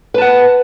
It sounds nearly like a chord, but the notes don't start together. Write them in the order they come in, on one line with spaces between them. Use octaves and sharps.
B4 A5 F#5